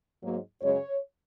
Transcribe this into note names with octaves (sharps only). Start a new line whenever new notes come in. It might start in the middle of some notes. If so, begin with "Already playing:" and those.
G#2 F#3 A#3
F#2 C#3 G#3 C#5